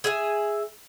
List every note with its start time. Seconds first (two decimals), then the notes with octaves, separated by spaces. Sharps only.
0.04 G#4 E5 F#5 G#5